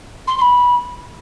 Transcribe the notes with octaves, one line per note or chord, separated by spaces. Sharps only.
C6
C6
B5